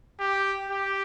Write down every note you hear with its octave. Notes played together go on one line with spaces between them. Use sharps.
G4
G4